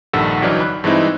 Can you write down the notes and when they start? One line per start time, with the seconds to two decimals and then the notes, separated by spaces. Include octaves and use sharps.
0.13 A#1 G2 D#3 A4 F#5 E6
0.42 G1 E3 F#3 D4 D#4 F6
0.60 B5 F#6
0.84 G2 E3 G#3 C4 D#4 E4